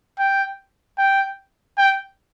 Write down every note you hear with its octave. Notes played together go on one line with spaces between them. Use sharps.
G5
G5
G5